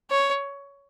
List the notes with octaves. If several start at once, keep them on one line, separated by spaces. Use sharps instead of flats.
C#5